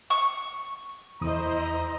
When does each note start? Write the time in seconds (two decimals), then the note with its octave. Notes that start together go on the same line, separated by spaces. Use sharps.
0.10 C#6
1.21 E2 E4 C5 D#5 A#5 D#6